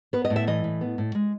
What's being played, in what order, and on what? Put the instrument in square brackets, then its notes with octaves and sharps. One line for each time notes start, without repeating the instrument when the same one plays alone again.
[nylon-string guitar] B3 B4
D#5
A2
E5
E3 D#5
A2
B3
A2
G#3